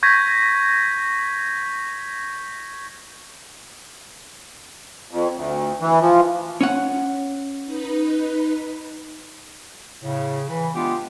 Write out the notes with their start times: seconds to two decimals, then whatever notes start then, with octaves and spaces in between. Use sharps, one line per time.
0.03 C#6 G6 G#6 A#6 B6
5.11 F2
5.36 D2
5.81 E3
6.01 F3
6.61 C#4 C#5 F#5
7.65 D#4 B4
10.02 A2 C#3
10.49 E3
10.75 G#3 B3 D4 F4 G4